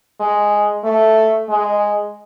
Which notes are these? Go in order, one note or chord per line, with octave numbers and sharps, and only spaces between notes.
G#3
A3
G#3